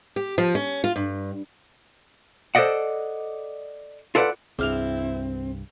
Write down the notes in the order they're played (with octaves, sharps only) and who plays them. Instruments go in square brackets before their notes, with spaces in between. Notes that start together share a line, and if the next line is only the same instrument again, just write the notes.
[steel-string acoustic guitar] G4
F3
C#4
F4
G2
[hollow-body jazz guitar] A4 C5 D5 D#5 F#5
F4 A4 B4 D5 F#5
[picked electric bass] C2 G2 [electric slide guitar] C4 [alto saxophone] E4 [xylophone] G#4 F6 F7